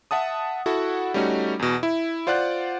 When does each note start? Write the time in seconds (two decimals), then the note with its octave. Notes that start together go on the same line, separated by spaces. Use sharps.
0.11 E5 F#5 A5 D#6
0.66 E4 F#4 A4 F#5
1.14 G3 A3 C#4 D#4 F#4
1.59 E2 B2
1.83 E4
2.27 F4 C5 D5 F#5 F#6